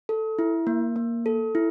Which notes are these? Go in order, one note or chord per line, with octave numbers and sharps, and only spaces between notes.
A4
E4
A#3
A#3
A4
E4